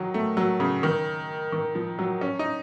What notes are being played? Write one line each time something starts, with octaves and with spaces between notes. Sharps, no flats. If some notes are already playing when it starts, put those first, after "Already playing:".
Already playing: D#3 F#3
A3
F#3
C#3
D#3
D#3
F3
F#3
C#4
D#4